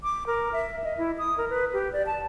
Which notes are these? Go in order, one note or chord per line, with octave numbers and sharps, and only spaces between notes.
D6
A#4
E5
D#5
E4
D#6
A#4
B4
G4
D5
A5